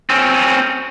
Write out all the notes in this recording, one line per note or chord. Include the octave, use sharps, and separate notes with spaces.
C4 C#4